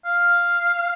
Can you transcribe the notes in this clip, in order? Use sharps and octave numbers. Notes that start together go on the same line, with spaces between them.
F5